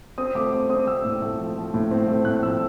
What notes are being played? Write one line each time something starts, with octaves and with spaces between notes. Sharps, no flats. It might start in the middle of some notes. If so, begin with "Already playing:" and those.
C4 D#6
A3 D6
C4 D6
C4 D#6
A3 E6
A2
A3
F3
F3
A2
C4
A3
A2 F#6
F3 E6